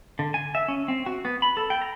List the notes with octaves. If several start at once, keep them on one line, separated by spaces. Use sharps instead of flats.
D3
G#5
E5
C#4
C4
F#4
B3
B5
A4
G5
A#5